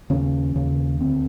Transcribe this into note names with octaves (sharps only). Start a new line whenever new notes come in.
D#2 C#3 C#4
D#2 C#3
D2 D3 C4